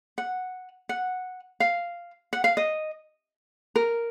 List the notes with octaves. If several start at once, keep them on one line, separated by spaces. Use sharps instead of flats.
F#5
F#5
F5
F#5
F5
D#5
A#4